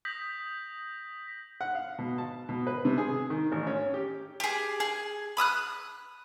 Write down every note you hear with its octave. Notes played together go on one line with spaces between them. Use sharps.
D#6 G6 A#6 B6 F#7
F#5
F5
B2
A5
B2
B4
C3
G#4
D#3
A1
C#4
G4
G4 G#4
G#4
B5 D#6 E6 F#6